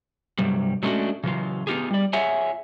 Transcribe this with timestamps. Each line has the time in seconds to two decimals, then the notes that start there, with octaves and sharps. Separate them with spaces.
0.39 G2 C3 F#3 G3
0.83 F#3 G#3 A3 C#4 D4 F#4
1.24 C#3 E3 F#3 F4
1.67 B3 D#4 F4 G4 G#4
1.91 G3 D5
2.13 F4 G#4 C#5 E5 F#5 G#5